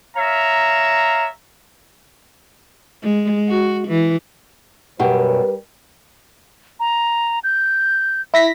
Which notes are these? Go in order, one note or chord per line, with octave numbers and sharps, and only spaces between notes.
C#5 E5 F5 A#5
G#3
F#4
E3
F#2 B2 G3 G4 A#4 B4
A#5
G6
E4 A#6 B6